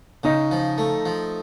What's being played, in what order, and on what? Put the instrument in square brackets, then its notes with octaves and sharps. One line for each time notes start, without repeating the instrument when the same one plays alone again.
[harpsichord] C#3 [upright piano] D#4
[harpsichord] F3
A3
F3